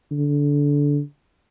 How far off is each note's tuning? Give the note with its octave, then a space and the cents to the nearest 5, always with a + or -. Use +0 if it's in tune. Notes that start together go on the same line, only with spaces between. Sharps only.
D3 -20